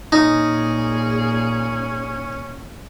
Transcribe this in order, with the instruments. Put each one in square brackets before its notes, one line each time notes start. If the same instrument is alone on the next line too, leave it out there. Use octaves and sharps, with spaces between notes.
[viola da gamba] A#2 G#4 [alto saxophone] C#4 [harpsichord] D#4